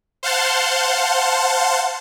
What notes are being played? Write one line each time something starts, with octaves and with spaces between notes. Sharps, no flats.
C5 F5 F#5 A5 C6